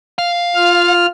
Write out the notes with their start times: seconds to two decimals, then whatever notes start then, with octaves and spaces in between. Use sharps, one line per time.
0.18 F5
0.55 F4 F6